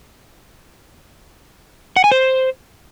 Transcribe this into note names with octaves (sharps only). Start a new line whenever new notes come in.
F#5
G#5
C5